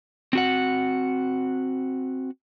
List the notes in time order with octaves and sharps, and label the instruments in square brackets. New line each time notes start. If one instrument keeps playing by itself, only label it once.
[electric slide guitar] C4 F#4 F#5